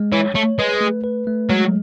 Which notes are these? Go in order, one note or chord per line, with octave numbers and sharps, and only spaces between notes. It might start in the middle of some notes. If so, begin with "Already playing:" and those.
Already playing: G#3
E3 C#5
A3 C#5
G#3 B4
A3
B4
A3
F#3 G#3